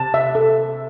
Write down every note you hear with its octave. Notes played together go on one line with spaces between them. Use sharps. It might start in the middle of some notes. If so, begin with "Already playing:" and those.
Already playing: C3 A5
E5
A4